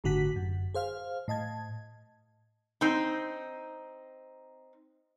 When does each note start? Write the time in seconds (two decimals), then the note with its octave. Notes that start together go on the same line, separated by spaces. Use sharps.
0.04 G1 A2 D3 F#4 F#5 B6
0.36 F#2
0.74 G#4 C5 F5 F6
1.28 A2 D#5 A5 G#6
2.81 C4 D#4